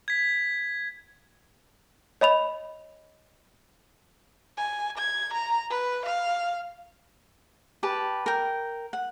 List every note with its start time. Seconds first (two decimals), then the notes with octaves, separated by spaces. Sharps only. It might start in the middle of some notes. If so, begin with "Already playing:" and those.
0.08 G#6 B6
2.21 C#5 D#5 B5 F7
4.57 G#5
4.98 G#6
5.33 A#5
5.70 B4
6.05 F5
7.83 G4 B4 A5
8.26 A#4 G5
8.93 F#5